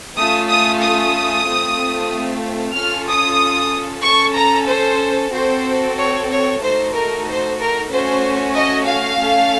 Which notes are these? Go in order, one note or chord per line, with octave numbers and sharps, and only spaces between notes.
A3 C#4 F4 D#6
D#6
D#6
A3 C4 F4
C#4 F4 A4 F6
D#6
C#4 A4 C#6
A#5
C5
C4 F#4 A4 C5
C#5
C#5
A3 D#4 F#4 A4 C5
A#4
C5
A#4
A3 C#4 F#4 C5
D#5
F5
A3 C#4 A4